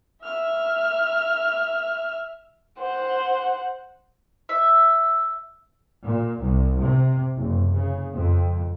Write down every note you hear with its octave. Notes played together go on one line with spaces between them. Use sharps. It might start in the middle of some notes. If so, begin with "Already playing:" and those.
E5 F6
C5 F#5
E5
A#2
C2
C3
F#1
C#3
F2